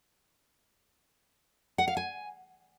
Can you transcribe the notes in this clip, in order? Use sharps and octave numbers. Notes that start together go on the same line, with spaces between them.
F#5
F5
G#5